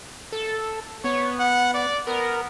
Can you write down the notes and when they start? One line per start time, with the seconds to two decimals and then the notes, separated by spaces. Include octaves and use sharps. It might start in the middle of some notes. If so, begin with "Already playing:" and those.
0.32 A4
1.04 B3 C#5
1.39 F#5
1.74 D5
2.07 B3 A#4